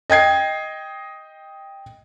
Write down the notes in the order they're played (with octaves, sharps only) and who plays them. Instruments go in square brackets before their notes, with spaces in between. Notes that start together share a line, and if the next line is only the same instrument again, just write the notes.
[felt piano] D#5 G5 G#6 C7